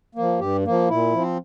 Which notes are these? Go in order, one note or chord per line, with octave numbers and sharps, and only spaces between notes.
F3 A#3
G2 G4
F3 A#3
A#2 E4
F3 C4